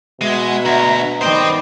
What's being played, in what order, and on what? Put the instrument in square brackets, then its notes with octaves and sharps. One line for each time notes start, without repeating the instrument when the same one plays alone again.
[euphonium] B2 [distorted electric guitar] G#3 [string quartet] E5 F#5
[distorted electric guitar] D2 [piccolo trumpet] A#5
[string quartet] D#3 G3 B3 [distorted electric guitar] C5 G5 [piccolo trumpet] D#5